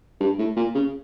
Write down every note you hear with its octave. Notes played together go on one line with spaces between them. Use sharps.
G2
A2
A#2
C#3